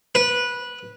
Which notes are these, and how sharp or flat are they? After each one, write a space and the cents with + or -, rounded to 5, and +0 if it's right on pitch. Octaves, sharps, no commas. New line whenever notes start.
B4 -15